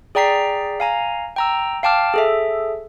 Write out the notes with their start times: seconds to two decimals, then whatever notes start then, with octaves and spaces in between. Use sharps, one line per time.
0.15 G#4 D5 G5 A#5 B6 C7
0.80 F5 G#5 A#5
1.36 G5 A#5 E6
1.83 F5 G5 A5 D6 F6
2.14 G#4 A4 E5